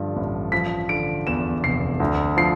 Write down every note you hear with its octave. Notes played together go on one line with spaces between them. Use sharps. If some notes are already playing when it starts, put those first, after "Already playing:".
Already playing: G2 D3 F3
A1
F3 B6
D3 D7
E2 E7
F1 C7
D2
F3 C7